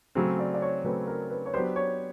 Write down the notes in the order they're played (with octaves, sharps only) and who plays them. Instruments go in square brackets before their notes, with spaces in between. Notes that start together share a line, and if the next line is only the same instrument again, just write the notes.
[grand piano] C#3 F#3 A3 C4 [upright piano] G#4
[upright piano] D5
D5
C#5
[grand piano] C#3 F#3 A3 C4 [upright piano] B4
[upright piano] A#4
B4
C#5
[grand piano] F#3 B3 D4 G4 B4 [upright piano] C5
[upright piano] C#5